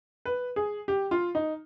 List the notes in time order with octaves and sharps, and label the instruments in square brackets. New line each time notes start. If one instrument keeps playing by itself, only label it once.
[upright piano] B4
G#4
G4
F4
D#4